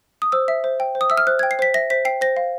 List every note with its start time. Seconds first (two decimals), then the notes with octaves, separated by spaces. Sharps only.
0.22 D#6
0.32 C5 E6
0.48 E5
0.64 C5
0.80 G5
0.95 C5
1.01 D#6
1.10 E5 E6
1.17 F6
1.27 C5 F#6
1.39 G5 G#6
1.51 C7
1.59 C5 B6
1.74 E5 A#6
1.90 C5 B6
2.05 G5 C7
2.21 C5 A#6
2.37 F5